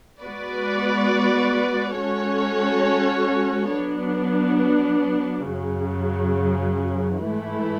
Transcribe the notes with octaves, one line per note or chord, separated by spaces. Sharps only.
G#3 B3 F#4 B4 D5
G#3 C#4 F#4 A4 C#5
F#3 B3 D4
F#2 C#3 F#3
G#2 E3 A3 E4